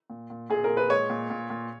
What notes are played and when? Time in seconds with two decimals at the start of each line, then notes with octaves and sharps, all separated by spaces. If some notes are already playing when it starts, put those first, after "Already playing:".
0.10 A#2
0.30 A#2
0.50 A#2 G#4
0.64 A#4
0.69 A#2
0.77 B4
0.90 G#3 C#5
1.10 A#2
1.30 A#2
1.50 A#2